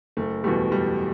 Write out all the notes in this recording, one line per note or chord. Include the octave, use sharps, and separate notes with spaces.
F#1 A3
E2 B2 G3 A3
F#1 G3